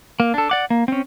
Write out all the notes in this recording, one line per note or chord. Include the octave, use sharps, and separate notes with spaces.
A#3
D4 A4
D5 F#5 D6
A#3
C4 C#4